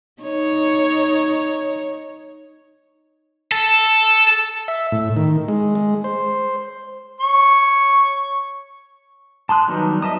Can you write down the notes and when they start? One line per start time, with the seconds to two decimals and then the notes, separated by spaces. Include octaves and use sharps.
0.22 D#4 C#5
3.52 A4
4.68 E5
4.92 A2
5.17 D#3
5.48 G#3
5.75 G#3
6.04 C5
7.21 C#5
9.49 A5 C6 D#6 F#6
9.67 D#3 F#3 G3 B3 D#4
10.02 D#5 E5 A5 D#6